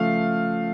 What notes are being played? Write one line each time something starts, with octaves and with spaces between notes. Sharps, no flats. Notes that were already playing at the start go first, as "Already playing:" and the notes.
Already playing: C#3 F3 A3 F5